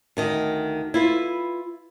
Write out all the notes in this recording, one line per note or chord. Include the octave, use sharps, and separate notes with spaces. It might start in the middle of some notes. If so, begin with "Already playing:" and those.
D2 D#3 D#5
E4 F4 B4